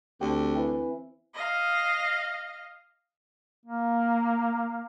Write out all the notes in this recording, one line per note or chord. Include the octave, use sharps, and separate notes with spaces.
D2 C4 G4
E3
D#5 F5
A#3